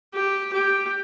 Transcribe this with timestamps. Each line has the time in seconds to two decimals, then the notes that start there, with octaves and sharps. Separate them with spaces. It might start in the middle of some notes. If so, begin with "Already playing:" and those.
0.14 G4
0.53 G4